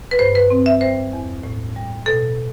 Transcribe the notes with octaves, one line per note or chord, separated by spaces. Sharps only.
B4
G2 C5
B4
C4
E5
G3 C5
E2
A2
G3
B2 A4